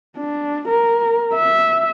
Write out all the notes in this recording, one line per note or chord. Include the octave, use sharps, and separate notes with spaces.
D4
A#4
E5